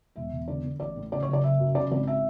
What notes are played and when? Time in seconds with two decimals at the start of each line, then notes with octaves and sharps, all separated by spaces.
0.16 E1 E5
0.32 E1
0.48 D3 D5
0.64 D3
0.80 A1 D5
0.96 A2
1.12 C#3 D5
1.23 C#5
1.28 F#1
1.33 D5
1.43 F#1 E5
1.60 F#2
1.75 C#3 D5
1.91 G#1 D5
2.07 E5